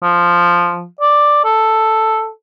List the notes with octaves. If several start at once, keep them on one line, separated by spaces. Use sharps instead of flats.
F3
D5
A4